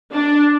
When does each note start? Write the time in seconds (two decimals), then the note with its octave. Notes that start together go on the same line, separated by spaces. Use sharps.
0.11 D4